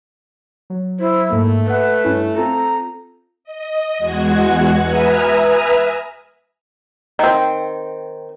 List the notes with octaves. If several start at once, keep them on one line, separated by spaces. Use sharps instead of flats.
F#3
E4 C5
G#2 A3 A#3
B4 E5 F#5
G2 C#4 E4
C4 F4 A4 A#5
D#5
E2 G#3 F#4 F#5 G#6
B4 E5 G#5 A#5 D#6 F6
D#3 C4